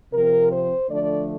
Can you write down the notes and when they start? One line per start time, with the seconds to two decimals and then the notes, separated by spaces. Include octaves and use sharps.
0.13 C3 F3 C4 A#4
0.52 C5
0.89 D3 F3 A3 D4 D5